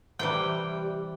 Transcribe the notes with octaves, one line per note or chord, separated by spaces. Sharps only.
C3 E3 G3 G5